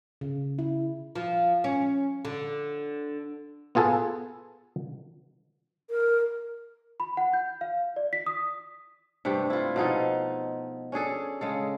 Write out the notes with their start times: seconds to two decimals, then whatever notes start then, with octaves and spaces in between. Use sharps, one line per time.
0.21 C#3
0.59 E4
1.16 F3
1.64 C#4
2.25 D3
3.75 B3 F4 G#4 A4 B4
5.90 A#4
7.00 B5
7.17 F#5
7.33 G6
7.61 F5
7.96 D5
8.13 B6
8.26 D#6
9.25 G2 C3 A3 G4
9.50 E4 F4
9.76 B2 F3 D#4 A4
10.92 C#4 D4 G#4 A4
11.41 C#3 G#3 A4